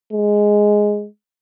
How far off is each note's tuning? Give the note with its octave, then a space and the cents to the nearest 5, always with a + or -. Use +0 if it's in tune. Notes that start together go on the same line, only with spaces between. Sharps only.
G#3 +0